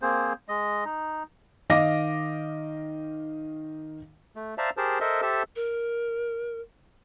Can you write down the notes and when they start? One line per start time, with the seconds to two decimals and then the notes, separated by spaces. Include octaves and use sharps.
0.02 A#3 C4 G#4 C5
0.48 G#3 D#5
0.85 D#4
1.70 D#3 D#5 F5 D6 A#6
4.36 A3
4.58 C5 D5 E5 F5 A5 A#5
4.77 G4 G#4 A#4 C5 A5
5.01 A4 A#4 C5 D#5 E5
5.22 G4 A4 C5 E5 A5
5.56 A#4